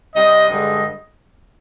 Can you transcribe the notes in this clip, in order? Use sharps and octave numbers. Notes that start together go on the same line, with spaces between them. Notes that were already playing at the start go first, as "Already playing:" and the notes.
C3 G3 D#5
G2 D3 G#3 D#5